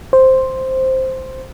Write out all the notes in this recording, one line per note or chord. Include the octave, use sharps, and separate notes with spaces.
C5